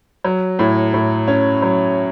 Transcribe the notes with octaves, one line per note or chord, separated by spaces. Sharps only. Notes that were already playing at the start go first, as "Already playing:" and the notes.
F#3
A2
A2
C#4
F#3